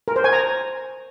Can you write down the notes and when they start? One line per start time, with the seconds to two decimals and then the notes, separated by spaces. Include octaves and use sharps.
0.08 A#4
0.16 C5
0.24 G#5
0.33 A#5